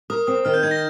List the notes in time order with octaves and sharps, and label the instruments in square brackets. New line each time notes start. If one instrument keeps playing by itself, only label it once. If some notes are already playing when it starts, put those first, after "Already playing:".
[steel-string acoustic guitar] A#4 [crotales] D#6
[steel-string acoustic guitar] C4 [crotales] D#6
[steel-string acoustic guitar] D#3 [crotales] F6
[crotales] G6
[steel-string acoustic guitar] D#4 [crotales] G#6
[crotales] A#6